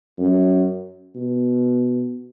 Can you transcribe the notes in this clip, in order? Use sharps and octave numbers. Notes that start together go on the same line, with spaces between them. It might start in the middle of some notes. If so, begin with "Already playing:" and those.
F#2
B2